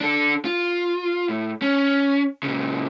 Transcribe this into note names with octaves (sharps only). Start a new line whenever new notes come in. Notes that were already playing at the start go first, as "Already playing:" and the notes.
D4 A4
F4
A2
C#4
A#2 C#3